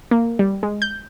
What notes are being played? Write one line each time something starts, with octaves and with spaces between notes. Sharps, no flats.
A#3
G3
G#3
G6